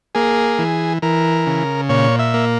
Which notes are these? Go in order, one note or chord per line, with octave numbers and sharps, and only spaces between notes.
A#3 G#4
E3
E3 A#4
C#3
A#2 C#5
E5
A#3